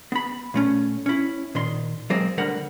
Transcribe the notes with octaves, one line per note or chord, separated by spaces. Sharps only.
B3 B5
A#2 A3 C#4
C#4 E4
A#2 D#3 C6
F#3 G#3 A#3 C4 D#5
D2 D3 G3 A#4 F#5